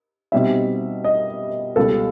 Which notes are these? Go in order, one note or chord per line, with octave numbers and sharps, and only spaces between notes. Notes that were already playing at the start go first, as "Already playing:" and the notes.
B2 G3 C4 D#4 E5
D#5
C#2 B2 G3 A4